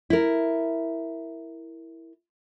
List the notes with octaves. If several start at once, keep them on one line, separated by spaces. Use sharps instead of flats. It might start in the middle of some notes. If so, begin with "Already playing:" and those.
E4 A#4